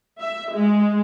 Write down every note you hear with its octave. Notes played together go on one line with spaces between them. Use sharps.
E5
G#3